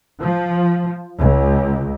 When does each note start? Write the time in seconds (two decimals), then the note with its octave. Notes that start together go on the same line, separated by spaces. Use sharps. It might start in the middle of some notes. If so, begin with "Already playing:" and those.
0.20 F3
1.20 C#2